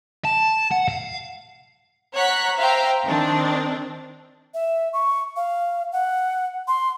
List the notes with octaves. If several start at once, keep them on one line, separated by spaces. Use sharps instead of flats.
A5
F#5
F5
C#5 F#5 A#5 F#6 B6
C5 E5 F5 G5 A#5
D#3 C4 D4
E5
C#6
F5
F#5
C6